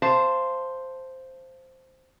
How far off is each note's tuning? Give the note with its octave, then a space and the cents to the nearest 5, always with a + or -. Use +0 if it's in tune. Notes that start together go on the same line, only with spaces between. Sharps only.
C5 +0 F5 -25 A5 +0